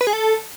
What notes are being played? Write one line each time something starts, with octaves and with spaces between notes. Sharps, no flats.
B4
G#4
A4